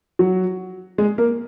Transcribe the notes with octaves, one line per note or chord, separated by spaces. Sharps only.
F#3 F#4
G#3 G#4
A#3 A#4